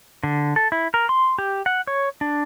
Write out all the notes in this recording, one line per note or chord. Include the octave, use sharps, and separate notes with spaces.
D3
A4
E4
A#4
C6
G4
F#5
C#5
D4